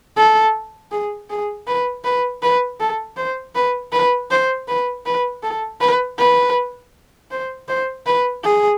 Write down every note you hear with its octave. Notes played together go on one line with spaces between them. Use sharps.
A4
G#4
G#4
B4
B4
B4
A4
C5
B4
B4
C5
B4
B4
A4
B4
B4
C5
C5
B4
G#4